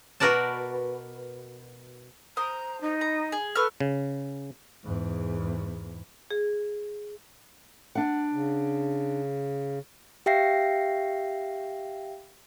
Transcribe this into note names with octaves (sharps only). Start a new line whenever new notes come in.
B2 F#4 A#4 B4 D5 A5
C5 A#5 D#6
D#4
A#5
G#4
A4 B4 C#6 F6
C#3
E2 G#2
G#4
D4 F#5
C#3
G4 E5 F5 G5 A#6 C7